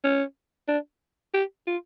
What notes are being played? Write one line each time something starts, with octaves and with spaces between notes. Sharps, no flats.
C#4
D4
G4
F4